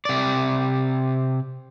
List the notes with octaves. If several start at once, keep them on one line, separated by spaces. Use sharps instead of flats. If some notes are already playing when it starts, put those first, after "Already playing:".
C3 D5